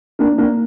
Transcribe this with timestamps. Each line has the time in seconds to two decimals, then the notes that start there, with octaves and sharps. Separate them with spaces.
0.19 A#3 D4
0.38 A#3 D4